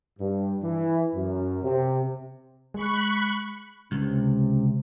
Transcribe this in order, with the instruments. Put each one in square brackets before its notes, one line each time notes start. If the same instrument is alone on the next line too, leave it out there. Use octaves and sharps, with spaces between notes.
[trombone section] G2
E3
F#2
C3
[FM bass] G#3 [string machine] B5 C#6 F#6
[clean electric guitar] C#2 [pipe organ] C3